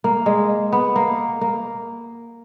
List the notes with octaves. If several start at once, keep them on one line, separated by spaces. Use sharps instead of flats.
A#3
G#3
B3
A#3
A#3